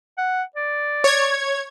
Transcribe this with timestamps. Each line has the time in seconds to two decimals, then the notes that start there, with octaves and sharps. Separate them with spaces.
0.18 F#5
0.56 D5
1.04 C#5 G#6